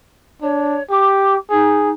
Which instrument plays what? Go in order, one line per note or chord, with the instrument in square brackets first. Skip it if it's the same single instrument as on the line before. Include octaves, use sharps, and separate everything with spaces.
[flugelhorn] D4 [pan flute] C#5
[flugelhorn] G4 [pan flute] D6
[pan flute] D#4 [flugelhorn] G#4